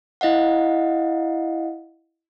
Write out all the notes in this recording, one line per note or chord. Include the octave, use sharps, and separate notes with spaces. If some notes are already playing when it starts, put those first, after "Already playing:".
E4 D#5 F5 F#5